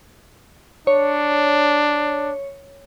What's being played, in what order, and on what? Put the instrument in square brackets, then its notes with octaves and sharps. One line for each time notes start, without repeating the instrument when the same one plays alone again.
[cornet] D4 [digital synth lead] C#5